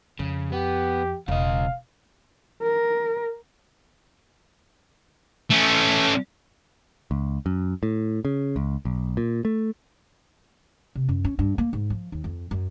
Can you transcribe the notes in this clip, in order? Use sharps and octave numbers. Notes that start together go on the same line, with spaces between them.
F2 C#3
B3 G4
E1 C#3 D#5 F5
A#4
A3 C#4
C#2
F#2
A2
C#3
C#2
B1
A#2
A3
C3
F#2
C#4
G2
A#3
G#2
F3
D#2
F2
F#2